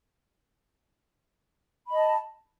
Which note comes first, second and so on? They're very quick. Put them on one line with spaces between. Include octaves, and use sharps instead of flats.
B5 D#5 A5